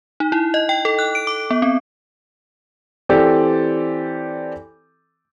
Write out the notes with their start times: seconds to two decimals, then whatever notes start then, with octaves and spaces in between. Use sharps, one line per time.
0.20 D#4
0.32 E4
0.54 D#5
0.69 G5
0.85 A4
0.99 F#6
1.15 D7
1.27 D6
1.51 B3
1.62 C4
3.09 E3 C4 G4 A4 D5